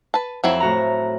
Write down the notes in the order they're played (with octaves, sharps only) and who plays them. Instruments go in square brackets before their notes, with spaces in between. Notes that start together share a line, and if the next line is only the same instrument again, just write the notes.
[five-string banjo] B4 A5
[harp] F2 [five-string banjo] F#3 C4 E4
[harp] A2 F#4 A#5